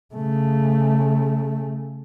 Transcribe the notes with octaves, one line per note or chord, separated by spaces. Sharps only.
C#3 A3